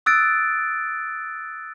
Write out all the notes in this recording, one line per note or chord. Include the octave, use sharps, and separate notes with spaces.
D#6 E6 F#6 A6 D7